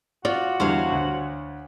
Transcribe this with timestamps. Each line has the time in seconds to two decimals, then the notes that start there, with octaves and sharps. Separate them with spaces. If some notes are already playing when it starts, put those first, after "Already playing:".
0.25 F4 F#4 D5
0.60 E2 D3 G3 C5 C#5 F5
0.92 D2